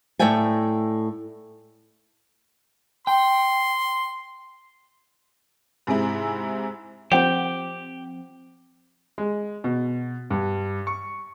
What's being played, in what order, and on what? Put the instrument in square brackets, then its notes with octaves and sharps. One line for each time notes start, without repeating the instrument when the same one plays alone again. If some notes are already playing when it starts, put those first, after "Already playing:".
[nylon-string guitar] A2 A3 D5 E5 G5 G#5
[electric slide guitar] G5 [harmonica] C6
[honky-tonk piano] G#2 C3 G#3 C4 E4
[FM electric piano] F3 C4 [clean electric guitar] G4 [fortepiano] C5 G5 [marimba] F#5 G6
[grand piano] G#3
B2
G2
C#6